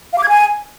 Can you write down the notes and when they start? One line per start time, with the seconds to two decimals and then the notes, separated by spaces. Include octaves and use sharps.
0.13 F5
0.18 D6
0.23 G#6
0.29 G#5